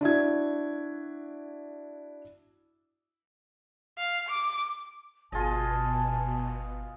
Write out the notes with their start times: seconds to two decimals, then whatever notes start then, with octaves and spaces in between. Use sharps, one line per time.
0.01 D4 E4 F#4 G#6
3.98 F5
4.28 D6
5.32 G1 B2 F4 G#4 D#5 A5